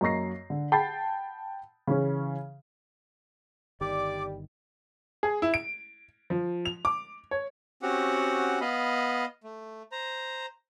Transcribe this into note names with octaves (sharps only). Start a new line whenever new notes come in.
F#2 A#3 D#5 C#6 A#6 C7
D3
F#5 G5 A5 B5 A6 C7
C#3 E3 C#4
G1 D#3 G3 D5 D6
G#4
E4
D7
F3
F7
D6
C#5
C4 C#4 F#4 G4 F#5
B3 D#5 F5 B5
A3
C5 A#5